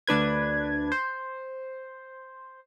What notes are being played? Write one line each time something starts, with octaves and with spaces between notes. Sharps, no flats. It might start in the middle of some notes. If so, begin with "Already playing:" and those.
D2 D4 B4 G#6
C5